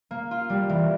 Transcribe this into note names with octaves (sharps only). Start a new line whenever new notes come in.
A#3
F4
G3
E3